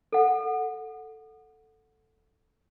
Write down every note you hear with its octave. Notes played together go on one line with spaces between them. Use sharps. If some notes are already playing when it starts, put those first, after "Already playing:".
A4 F#5